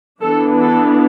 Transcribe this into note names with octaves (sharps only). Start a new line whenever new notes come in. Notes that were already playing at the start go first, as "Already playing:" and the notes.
E3 B3 D4 A4
A4